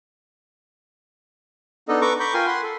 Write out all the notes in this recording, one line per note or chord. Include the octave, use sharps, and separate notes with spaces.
B3 D4 D#4 A4 D#5
A4 B4 A#5 C#6 D6
A#5 B5 C#6 D6 G6
F4 A#4 G5 G#5 C6
F#5 B5 C6
A4